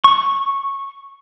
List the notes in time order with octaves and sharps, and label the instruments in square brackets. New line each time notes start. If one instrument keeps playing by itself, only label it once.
[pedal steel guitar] C#6